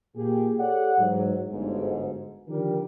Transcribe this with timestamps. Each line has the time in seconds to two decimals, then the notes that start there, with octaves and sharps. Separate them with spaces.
0.15 A#2 A#3 G4 G#4
0.60 G4 A4 C#5 D5 F#5
0.99 G#2 E3 F#3
1.50 G1 D2 G#2
2.48 D3 D#3 F3 G3 G4 A#4